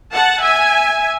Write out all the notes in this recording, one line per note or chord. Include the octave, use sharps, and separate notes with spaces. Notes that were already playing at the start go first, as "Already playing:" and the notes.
F#5 A5
E5 G#5